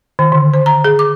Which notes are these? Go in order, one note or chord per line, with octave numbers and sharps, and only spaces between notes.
D#3
D3
C5
A#5
G#4
D6